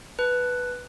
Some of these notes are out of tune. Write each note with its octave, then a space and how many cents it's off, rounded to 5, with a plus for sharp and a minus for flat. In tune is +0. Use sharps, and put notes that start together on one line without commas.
B4 +0 A5 +0